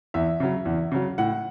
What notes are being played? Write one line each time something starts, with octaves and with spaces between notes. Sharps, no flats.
E2 E5
C#3 F#3
E2
C#3 F#3
A2 F#5